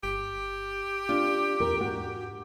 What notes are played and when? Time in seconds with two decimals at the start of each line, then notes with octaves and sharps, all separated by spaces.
0.03 G1 G4
1.09 D4 F4
1.60 E2 A#4
1.81 G#2 F#4